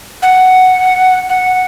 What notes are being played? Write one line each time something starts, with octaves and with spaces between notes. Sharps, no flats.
F#5
F#5